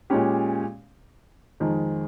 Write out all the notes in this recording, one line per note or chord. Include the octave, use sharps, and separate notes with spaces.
A#2 G#3 C#4 G4
F2 D#3 G#3